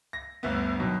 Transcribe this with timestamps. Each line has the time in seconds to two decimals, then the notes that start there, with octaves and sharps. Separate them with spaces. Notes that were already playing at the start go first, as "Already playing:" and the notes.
0.13 A#6
0.43 G1 D2 B3
0.79 F#2 B2 D#3